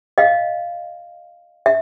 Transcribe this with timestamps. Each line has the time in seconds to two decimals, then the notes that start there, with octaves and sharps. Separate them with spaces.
0.18 D#5 F5
1.66 E5